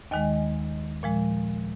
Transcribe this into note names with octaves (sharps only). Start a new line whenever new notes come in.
D#2 D#3 G#3 D#5 G#5
A#2 F3 G#3